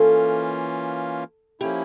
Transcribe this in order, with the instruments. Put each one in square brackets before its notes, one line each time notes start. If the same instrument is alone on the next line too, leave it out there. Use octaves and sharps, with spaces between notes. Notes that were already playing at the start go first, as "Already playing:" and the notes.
Already playing: [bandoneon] E3 A#3 C#4 F4 [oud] A4
[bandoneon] F3 A#3 C#4 E4 [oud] G4